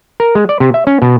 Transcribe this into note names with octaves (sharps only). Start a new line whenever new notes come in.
A#4
G#3
D5
C3
E5
C#4
B2